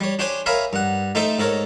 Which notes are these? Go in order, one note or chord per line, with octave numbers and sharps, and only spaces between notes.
G3 C#5
D4 G4 C5 C#5 G#5
A#4 C#5 E5 F5 G#5 B5
G2 F#5
A3 D#4 A4 C5 E5
G#2 A4 A#4 C#5